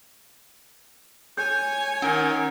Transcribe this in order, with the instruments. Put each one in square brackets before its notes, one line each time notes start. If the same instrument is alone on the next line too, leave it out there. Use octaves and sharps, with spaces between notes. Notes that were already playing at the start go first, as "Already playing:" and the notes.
[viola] C#5 G#5 [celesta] G6
[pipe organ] D#3 A#4 [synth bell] C#4